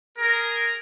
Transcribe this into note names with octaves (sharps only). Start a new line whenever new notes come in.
G#4 A#4